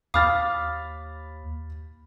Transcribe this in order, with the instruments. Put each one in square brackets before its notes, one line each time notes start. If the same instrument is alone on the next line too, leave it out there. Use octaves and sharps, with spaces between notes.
[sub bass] D#2 [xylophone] F5 D6 D#6 [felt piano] B5 F6 A6